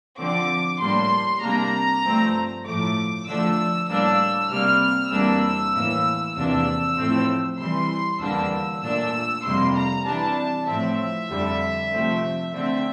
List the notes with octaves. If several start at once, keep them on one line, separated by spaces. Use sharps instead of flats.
D3 F3 C4 D6
A2 G3 A#3 D4 C6
C3 G3 A#3 D4 A#5
G2 F3 A3 C4
A2 F3 A3 D6
D3 F3 A3 D4 E6
A2 G3 A#3 D4 E6
C3 G3 A#3 F6
E2 C3 G3 A#3 D4 E6
A2 E3 A#3
E2 C3 F3 A#3 D4 E6
A2 F3 A3 C4
C3 E3 G3 C6
E2 D3 G3 A#3 D4 E6
A#2 A3 D4 E6
F2 C3 G3 A#3 C6
A#5
C3 E3 G3 D4 A5
A2 F3 C4 E5
F2 D3 G3
C3 F3 A3 C4
D3 A3 C4 E5